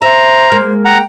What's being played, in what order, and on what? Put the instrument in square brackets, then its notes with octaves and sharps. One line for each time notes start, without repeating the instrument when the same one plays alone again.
[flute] C5 [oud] E5 [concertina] A#5
[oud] G#3 A#3
[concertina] F#5 A#5 [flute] G5